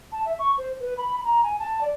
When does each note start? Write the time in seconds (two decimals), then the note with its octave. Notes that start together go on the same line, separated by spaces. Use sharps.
0.12 A5
0.25 E5
0.39 C#6
0.58 C5
0.80 B4
0.97 B5
1.24 A#5
1.43 G#5
1.59 A5
1.81 D5